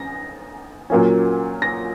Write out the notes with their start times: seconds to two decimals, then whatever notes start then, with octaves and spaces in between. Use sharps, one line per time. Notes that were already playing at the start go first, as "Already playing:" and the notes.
Already playing: C#4 A#6
0.90 A#2 F#3 A#3 C#4
1.62 A#6